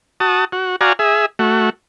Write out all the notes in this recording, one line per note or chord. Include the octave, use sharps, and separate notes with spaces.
F#4 A5 D#6
F#4
F#4 D5 F5 G#5 A#5
G#4 E5
A3 F#4